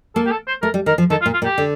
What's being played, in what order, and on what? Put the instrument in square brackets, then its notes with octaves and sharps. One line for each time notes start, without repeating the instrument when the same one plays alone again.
[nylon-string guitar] A#3 [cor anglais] A4
[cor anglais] G4
A4
C5
[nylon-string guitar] A3 [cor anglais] A#4
[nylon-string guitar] G3
[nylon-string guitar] D#3 [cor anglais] A#4
[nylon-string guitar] F3
[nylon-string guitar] D#3 [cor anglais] A4
[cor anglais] F4
[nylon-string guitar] A#2
[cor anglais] F4
[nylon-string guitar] A#2
[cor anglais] G4
[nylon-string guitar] D3